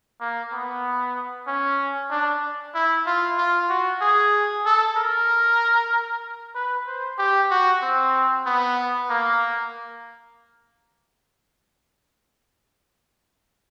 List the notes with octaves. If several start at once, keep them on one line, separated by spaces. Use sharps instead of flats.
A#3
B3
C#4
D4
E4
F4
F4
F#4
G#4
A4
A#4
B4
C5
G4
F#4
C4
B3
A#3